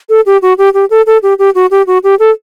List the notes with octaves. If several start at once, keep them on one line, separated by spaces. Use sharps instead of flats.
A4
G4
F#4
G4
G4
A4
A4
G4
G4
F#4
G4
F#4
G4
A4